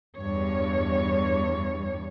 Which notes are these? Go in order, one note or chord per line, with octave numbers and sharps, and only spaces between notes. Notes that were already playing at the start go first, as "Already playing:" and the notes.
E2 G2 C#5